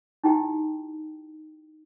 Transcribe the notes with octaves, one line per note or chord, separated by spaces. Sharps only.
D#4 E4 G4 G5